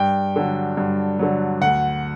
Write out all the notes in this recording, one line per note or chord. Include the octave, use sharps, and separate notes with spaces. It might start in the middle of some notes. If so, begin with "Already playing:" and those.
Already playing: G2 G5
D3 F#3
G2
D3 F#3
D2 F#5